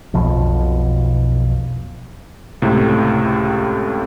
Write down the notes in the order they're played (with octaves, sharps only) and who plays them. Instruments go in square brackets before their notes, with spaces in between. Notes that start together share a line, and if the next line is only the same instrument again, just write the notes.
[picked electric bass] B1 F2 B2 F3
[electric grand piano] C#2 A2 C3